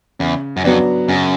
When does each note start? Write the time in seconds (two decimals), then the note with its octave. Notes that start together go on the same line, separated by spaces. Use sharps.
0.19 E2 C#3
0.57 F#2
0.64 F2 F#3 B3 D4
1.08 F#2 C#3